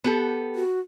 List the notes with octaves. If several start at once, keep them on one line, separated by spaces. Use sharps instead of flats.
B3 G4 A4
F#4